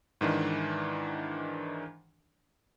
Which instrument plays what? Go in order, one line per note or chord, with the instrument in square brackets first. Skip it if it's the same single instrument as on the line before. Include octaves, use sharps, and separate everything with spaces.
[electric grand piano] G#2 D#3 E3 D4